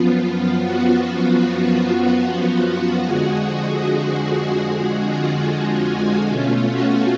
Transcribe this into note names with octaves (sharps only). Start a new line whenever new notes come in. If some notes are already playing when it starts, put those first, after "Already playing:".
Already playing: F#2 F3 B3 F4
F4
F#4
F2 D3 F3 G#3 G#4
F#4
F4
G#3 G#4
B2 A3 C#4 F4
F#4